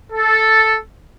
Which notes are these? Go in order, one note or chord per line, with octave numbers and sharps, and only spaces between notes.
A4